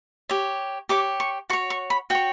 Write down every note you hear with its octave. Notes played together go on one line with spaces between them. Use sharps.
G4 C#5
G4 C#5 D6
C#6
F#4 C#5 C#6
C#6
B5
F#4 C#5 G5